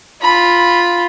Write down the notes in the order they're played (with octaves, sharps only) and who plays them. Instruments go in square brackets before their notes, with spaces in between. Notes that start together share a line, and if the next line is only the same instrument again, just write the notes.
[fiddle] F4 B5